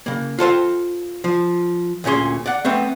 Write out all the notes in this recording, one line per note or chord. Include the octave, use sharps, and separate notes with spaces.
C#3 A#3
F4 A4 C5 F5
F3
D2 A#2 C#4 G#4 C6
D5 F#5
A3 B3 C4